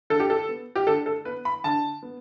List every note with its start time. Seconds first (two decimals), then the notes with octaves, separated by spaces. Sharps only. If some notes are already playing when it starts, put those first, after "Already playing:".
0.10 D3 A4
0.20 G4
0.30 A4
0.49 B3
0.75 G4
0.87 D3 A4
1.06 A4
1.25 B3 B4
1.45 B5
1.64 D3 A5
2.03 B3